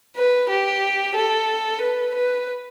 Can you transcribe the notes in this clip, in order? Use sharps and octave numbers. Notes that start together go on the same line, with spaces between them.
B4
G4
A4
B4
B4